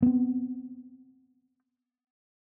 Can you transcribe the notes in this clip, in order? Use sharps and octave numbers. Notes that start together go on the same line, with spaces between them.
B3 C4